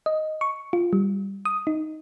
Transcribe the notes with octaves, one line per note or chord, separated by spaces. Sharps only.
D#5
C#6
F4
G3
D#6
D#4